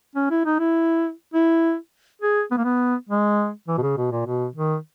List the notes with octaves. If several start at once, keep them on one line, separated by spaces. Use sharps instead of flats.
C#4
E4
D#4
E4
E4
G#4
B3
A#3
B3
G#3
E3
B2
C#3
B2
A#2
B2
D#3